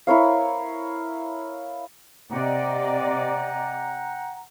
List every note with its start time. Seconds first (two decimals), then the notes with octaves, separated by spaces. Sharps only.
0.07 E4 A#4 C#5 F5
2.31 C3 D5 D#5 F#5 G5 A#5